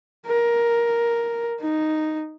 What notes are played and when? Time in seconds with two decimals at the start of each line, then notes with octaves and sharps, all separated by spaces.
0.27 A#4
1.61 D#4